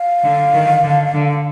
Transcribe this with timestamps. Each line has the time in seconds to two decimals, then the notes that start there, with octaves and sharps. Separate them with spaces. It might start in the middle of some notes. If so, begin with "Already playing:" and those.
Already playing: F5
0.24 D3
0.53 D#3
0.83 D3
1.14 D3